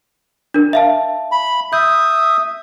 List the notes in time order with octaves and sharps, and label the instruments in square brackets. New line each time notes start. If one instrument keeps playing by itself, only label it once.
[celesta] D4 A#4
E5 F5 A5
[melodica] B5
[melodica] E5 D#6 [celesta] G6